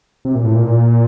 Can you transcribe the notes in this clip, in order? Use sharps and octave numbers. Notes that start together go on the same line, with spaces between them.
C3
A#2
A2
A#2